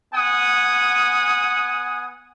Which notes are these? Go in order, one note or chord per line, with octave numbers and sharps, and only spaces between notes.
B3 F#5 G#5 D#6